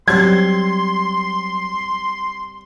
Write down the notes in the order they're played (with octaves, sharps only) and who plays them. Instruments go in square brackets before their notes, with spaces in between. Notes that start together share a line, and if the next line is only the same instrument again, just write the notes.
[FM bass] F#3 [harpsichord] G3 C4 [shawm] C6 [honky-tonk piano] G#6